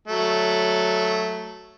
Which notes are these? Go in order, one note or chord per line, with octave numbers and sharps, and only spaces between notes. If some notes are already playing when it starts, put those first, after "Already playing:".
F#3 A3